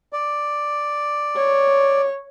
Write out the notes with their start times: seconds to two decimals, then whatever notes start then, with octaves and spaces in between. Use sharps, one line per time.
0.13 D5
1.36 C#5